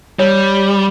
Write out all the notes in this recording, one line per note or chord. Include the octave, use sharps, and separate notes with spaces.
G3 C#5